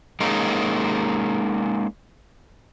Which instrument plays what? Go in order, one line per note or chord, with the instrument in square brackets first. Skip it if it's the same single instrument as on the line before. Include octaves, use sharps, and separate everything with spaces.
[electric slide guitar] G#3 A#3 C#4 D#4